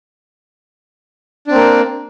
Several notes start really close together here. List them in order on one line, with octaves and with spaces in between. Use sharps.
D4 C4 A#3